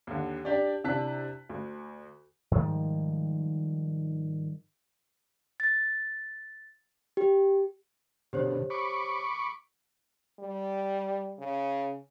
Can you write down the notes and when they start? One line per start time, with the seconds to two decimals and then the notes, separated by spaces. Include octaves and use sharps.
0.07 D#2 D3
0.45 D4 G4 D5
0.84 C3 D4 E4 A5 F#6 B6
1.49 D2
2.51 G#2 D#3 F3 G3
5.60 A6
7.17 G4
8.33 B2 D3 G4 C5 C#5
8.70 B5 C#6 D6
10.40 G3
11.38 C#3